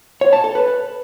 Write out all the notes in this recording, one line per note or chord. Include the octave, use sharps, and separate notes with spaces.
C#5
A5
A4
B4